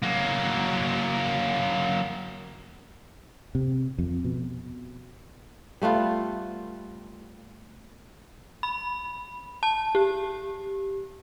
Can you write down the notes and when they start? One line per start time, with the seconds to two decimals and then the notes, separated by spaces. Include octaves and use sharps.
0.02 F#3 A#3
3.55 C3
3.98 F2
4.25 B2
5.82 G3 A3 B3 F4
8.63 B5
9.63 A5
9.95 G4